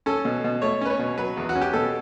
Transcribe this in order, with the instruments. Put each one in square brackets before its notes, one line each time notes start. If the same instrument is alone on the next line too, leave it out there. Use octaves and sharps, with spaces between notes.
[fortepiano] C#4 A4
B2
B2
A3 C#5
C#4 B4
C#5
B2
F#3 B4
E2
F#4
C#4
G4
B2 A4